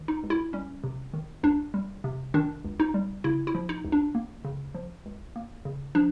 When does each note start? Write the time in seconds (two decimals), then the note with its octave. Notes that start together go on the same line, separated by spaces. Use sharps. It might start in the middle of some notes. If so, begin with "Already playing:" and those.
Already playing: D#3
0.08 D#4
0.23 C#2
0.30 E4
0.53 G3 C#4
0.84 C3
1.14 D#3
1.43 C#2 D4
1.74 G3
2.04 C3
2.34 D#3 D4
2.64 C#2
2.80 D#4
2.94 G3
3.24 C#3 E4
3.47 E4
3.55 F3
3.69 D#4
3.85 C#2
3.92 D4
4.15 A#3
4.45 C#3
4.75 F3
5.06 C#2
5.36 A#3
5.65 C#3
5.95 F3 D4